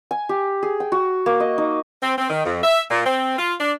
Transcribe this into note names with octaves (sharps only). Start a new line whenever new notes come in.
G#5
G4
G#4
G5
F#4
A#3
D#5
D#4
C4
C4
D#3
F2
E5
A#2
C4
F4
D4